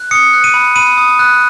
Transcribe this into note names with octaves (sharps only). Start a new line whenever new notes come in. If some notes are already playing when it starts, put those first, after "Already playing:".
Already playing: F#6
D#6 C#7
F#6
D#7
B5
B5 D#7
D#6
F#6